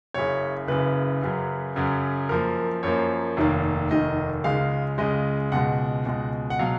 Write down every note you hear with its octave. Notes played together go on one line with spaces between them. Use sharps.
F#1 F#2 C#3 C#5
F#1 F#2 C#3 B4
F#2 C#3 F#3
F#2 C#3 F#3
F#2 F3 A#3 A#4
F#2 F3 A#3 C#5
F1 D#2 D#3 A#3
F1 D#2 D#3 A#3 D#5
C#2 C#3 G#3 F5
C#2 C#3 G#3 D#5
C#2 B2 G#3 F#5
C#2 B2 G#3
F#5
B2 F#3 F5